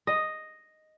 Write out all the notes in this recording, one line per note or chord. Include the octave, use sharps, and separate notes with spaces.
D#5